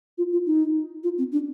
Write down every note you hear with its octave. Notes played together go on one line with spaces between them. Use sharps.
F4
F4
D#4
F4
C4
D4